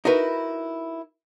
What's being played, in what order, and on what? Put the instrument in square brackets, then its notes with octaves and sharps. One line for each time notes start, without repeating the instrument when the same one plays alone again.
[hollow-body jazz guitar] D#4 E4 F#4 A#4 B4